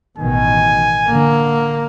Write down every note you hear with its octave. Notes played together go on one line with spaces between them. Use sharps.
A1 B2 D#3 G#5
D3 A#3